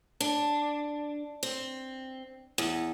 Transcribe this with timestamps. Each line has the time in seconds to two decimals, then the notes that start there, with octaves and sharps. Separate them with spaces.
0.20 D4
1.43 C4
2.58 E2